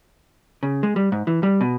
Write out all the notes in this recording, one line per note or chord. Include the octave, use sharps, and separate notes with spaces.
C#3
G#3
G3
G#2
E3
G3
B2